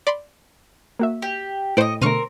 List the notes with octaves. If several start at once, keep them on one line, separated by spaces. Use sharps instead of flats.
D5 B5 C6
A#3 F#4 E5
G4
A2 C5 D5 D#5 C#7 D7
B2 D3 A3 C4 A#4 C#6 F6 D#7